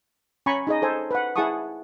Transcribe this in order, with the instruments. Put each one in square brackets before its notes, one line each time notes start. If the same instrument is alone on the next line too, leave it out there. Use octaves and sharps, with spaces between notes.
[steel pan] C#4 G#5 A#5 B5 C#6
D#4 G#4 D#5
A4 C5 G#5
B4 F#5
E4 G#4 F#5 A5 C#6 D#6